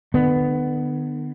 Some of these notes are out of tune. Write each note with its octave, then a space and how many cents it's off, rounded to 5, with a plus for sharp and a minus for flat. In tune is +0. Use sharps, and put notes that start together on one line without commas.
D3 +45 B3 +15